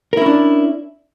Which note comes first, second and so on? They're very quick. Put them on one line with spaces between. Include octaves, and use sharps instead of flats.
A#4 E4 C#4 D4